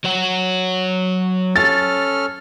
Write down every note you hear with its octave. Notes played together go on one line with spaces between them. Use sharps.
F#3 C#5 F#5
C#4 A4 F6 A6